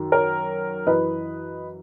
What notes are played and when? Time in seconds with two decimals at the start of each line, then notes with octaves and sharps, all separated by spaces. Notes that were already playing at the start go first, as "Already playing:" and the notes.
Already playing: F#2 D#3
0.12 A#4 C#5
0.87 F#2 E3 B4 D#5